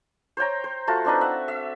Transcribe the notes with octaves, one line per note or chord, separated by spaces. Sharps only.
C5 C#5 G5 A#5
C5
A3 F4 F#4 A5
C4 D4 D#4 B4
E5 F#5
E5